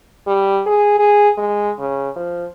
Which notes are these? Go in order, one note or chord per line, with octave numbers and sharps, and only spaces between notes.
G3
G#4
G#4
G#3
C#3
F3